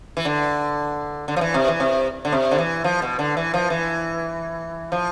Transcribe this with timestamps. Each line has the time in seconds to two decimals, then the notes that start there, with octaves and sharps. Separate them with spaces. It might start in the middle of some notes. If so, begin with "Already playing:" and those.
0.17 E3
0.25 D3
1.28 D3
1.36 F3
1.41 E3
1.54 C3
1.68 E3
1.80 C3
2.25 D3
2.32 C3
2.51 D3
2.59 E3
2.84 F3
3.02 B2
3.19 D3
3.37 E3
3.54 F3
3.70 E3
4.92 F3